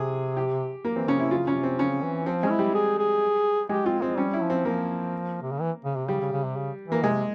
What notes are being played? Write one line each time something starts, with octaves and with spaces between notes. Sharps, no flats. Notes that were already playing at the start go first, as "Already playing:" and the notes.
Already playing: C3 G#4
G4
A#3
E3 C4
C#3 C#4
C3 E4
C#3 F4
C#4
C3
C4
C#3 C#4
E3
F3 C4
G#3 C#4
E4
G3
G#4
G#4
G#3 G4
C4 F4
G#3 C4
G3 C#4
E4
F3
C4
F3 A#3
C3
C#3
E3
C#3
C3
C#3 G3
C#3
C#3
C3
C#3
E3 A#3
C3 G#3